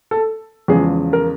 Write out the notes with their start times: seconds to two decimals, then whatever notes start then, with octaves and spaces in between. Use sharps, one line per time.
0.11 A4
0.68 E2 C#3 F3 G#3 G#4
1.13 A#4